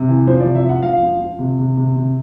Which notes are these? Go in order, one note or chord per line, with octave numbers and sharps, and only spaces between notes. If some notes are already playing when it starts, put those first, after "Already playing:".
Already playing: C3
E3
F3 C5
D5
C3
E5
F3 F#5
F3 F5
F3
F3
C3
C3
C3
C3